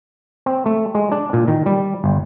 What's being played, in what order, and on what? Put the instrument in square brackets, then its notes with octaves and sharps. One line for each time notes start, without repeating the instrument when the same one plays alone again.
[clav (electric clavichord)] C4
A3
G#3
D4
A#2
D#3
G3
G1